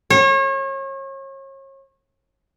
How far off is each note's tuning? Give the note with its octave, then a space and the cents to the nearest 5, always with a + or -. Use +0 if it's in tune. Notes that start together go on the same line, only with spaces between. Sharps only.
C#5 -35